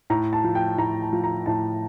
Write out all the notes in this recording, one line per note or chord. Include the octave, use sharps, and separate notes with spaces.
A2 A#5
A5
F3
G5
A2 A#5
A5
F3
A#5
A2 A5